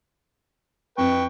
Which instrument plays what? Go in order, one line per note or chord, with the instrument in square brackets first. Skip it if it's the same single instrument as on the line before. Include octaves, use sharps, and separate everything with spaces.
[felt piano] F2 [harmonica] B4 G5 C#6